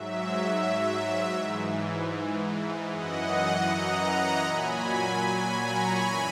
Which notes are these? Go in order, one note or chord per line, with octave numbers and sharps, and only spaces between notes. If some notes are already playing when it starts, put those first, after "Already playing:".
Already playing: G#2 F#3 E5
E5
G#2 E3
F#2 E3 D#5 F#5
F#5 A#5
A#2 F#3 G#5 B5
G#5 B5
A#5 C#6
F#2 E3 G#5 B5